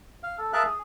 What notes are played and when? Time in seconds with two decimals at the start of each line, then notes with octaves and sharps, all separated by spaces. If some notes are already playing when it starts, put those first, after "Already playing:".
0.23 F5
0.38 A4
0.53 G#4 A#4 E5 F5 A5 F#6
0.67 G#4